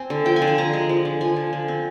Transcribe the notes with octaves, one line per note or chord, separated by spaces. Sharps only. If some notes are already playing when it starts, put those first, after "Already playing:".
Already playing: C4 G#5
D3
F3 G5
G#5
D3
G#5
D3 A#5
G#3
F3
D3
F3 G#5
D3
D3
C4